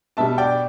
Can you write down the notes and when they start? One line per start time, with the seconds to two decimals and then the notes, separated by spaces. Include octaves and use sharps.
0.17 B2 G3 E5 A5
0.38 D5 G5